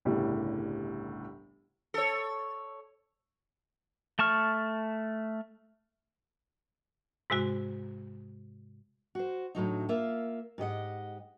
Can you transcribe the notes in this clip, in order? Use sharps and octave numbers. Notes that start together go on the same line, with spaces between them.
G1 C2 A2 C#3 E3 G3
A4 C#5
A3 A5 C#6 F6
G#2 C3 G#3 F#4
F#4 C5
D2 A2 F#3 D#4
A#3 F4 E5
G#2 G4 D#5 F#5